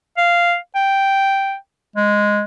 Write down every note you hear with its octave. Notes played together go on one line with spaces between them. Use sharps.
F5
G5
G#3